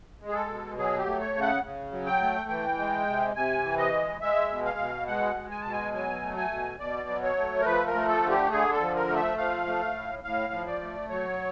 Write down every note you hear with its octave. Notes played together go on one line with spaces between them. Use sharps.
G#3
G#4
A4
B2
F#3 G#4
G4
A3
C#5
C#3
F#5
C#3
F#3
G5
A3
E3 G5
G#3
C3
C3 G#5
E3
D#5
G#3
G#3 E5
B2
F5
B2
G#3 F#5
G#3
G#5
B2 A5
G#5
F#3 G#5
A3
G#5
B2
B2 D5
F#3
C#5
A3
A#4
F3 B4
A#4
A3
A4
D3
G4
D3 G#4
A4
F3
A#4
A3
E5
F3 F5
A3
A2
A2 F5
F3
D5
A3
F#3 C#5